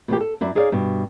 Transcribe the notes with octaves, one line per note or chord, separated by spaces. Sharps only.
B2 F3 A#3 G4
A4
F#2 E4 D5
D#4 G#4 C#5 D5 F5
G2 B2